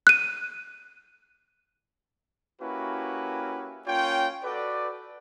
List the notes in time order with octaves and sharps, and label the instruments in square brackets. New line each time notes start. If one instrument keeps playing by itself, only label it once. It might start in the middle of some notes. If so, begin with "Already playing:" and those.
[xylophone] F#6 D#7
[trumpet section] A#3 C#4 E4 F#4 G4 B4
A#3 C#4 F4 C#5 G5
F#4 A4 B4 D5